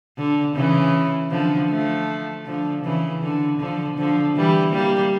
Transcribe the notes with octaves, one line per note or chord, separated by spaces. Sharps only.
D3
C#3 E3
D3 F3
F3 A3
D3 F3
C#3 E3
D3
D3 F3
D3 F3
E3 G3
G3 A#3